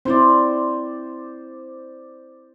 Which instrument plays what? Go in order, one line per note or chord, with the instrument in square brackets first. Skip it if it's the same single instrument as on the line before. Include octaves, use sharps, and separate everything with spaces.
[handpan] C4 E4 [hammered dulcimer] C5 D5